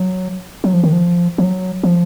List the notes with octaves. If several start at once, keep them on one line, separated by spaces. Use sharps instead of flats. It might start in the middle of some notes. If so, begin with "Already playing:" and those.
Already playing: F#3
F#3
F3
D#3
F3
F3
F#3
F3